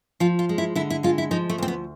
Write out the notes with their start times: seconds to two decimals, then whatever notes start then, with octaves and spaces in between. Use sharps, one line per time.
0.20 F3 F4
0.39 F4
0.49 G#3
0.58 E4
0.75 D3 E4
0.90 E4
1.03 G#3 F4
1.18 E4
1.31 F3 D#4
1.50 A3
1.58 D2 C4
1.68 B3